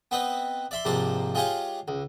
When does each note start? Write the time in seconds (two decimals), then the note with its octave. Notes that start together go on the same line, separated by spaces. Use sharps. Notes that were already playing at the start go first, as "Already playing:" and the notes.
0.11 B3 C4 B4 D#5
0.71 D5 E5 C6
0.85 G#2 C3 F3 A#3 D5 C6
1.35 G#3 F4 G4 G#4 C#5 F5
1.88 C#2